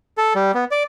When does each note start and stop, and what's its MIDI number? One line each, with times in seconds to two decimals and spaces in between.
0.18 0.33 69
0.35 0.52 55
0.54 0.65 59
0.71 0.83 74